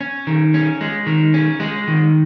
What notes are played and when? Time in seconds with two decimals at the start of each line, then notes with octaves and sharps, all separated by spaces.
0.01 C#4
0.27 D#3
0.54 C#4
0.81 G#3
1.07 D#3
1.34 C#4
1.60 G#3
1.88 D#3